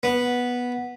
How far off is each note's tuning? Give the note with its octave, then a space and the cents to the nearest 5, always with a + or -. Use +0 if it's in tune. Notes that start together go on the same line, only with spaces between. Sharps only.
B3 -10